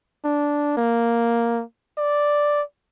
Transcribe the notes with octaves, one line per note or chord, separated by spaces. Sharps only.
D4
A#3
D5